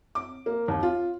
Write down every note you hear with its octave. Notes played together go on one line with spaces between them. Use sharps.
D6
A#3
D#2
F4